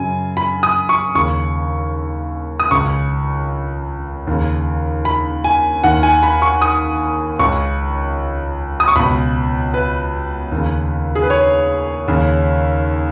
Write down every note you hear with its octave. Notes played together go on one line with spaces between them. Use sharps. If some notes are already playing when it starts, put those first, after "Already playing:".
Already playing: F#2 C#3 G#5
B5
D#6
C#6
D#2 C#3 C#6
D#6
C#2 C#3 C#6
D#2 C#3
B5
G#5
D#2 D#3 F#5
G#5
B5
C#6
D#6
C#2 C#3 C#6
D#6
C#6
C#2 B2 B5
B4
D#2 C#3
G#4
B4
C#5
D#2 C#3